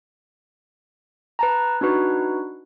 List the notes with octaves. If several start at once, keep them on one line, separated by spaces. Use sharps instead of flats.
B4 A5 A#5
D4 D#4 F#4 B4